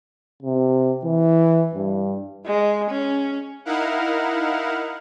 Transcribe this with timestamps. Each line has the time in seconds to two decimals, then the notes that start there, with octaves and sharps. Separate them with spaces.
0.43 C3
1.04 E3
1.75 G2
2.46 G#3
2.91 C#4
3.65 D#4 E4 A#4 F5 F#5